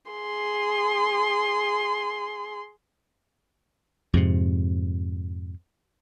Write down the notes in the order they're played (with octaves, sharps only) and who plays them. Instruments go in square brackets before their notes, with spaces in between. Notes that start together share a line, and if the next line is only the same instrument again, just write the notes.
[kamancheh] G#4 C6
[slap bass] F2 G#2 C3